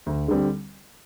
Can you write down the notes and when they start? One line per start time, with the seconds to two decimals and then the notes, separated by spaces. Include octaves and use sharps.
0.06 D2
0.28 D3 G3 C4